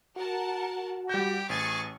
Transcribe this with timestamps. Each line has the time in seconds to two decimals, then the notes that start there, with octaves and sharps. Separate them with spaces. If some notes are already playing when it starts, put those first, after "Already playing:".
0.16 F#4 A#4 F#5 A5
1.09 G3 G4 G5 G6
1.49 A1 G#4 C#6 A6